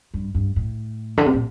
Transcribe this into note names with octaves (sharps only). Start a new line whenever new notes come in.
G2
G2
A2
D3
C3
A#2